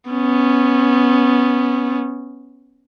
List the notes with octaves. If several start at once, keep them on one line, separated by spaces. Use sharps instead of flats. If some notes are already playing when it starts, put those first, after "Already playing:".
B3 C#4